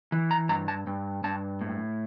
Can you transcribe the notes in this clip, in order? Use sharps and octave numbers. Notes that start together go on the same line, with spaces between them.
E3
A#5
G2 A#5
A5
G2
G2 A5
A2